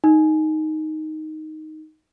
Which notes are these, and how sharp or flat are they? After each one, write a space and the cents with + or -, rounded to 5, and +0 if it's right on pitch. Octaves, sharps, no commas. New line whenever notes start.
D#4 +0